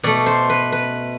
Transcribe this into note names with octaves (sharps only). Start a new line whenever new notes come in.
B2 A3 D5
C5
B4
B4